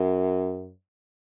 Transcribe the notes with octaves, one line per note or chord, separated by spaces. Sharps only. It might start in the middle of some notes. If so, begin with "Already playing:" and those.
Already playing: F#2